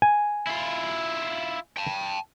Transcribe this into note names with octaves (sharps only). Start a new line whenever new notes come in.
G#5
E4 F4
G5 A5